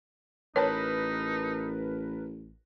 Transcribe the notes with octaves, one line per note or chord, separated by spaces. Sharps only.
A1 D#4 A#4 B4 C#5 A5